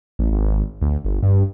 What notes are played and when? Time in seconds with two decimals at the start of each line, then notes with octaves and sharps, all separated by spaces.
0.19 A1
0.31 G#1
0.82 D2
1.05 G1
1.23 G2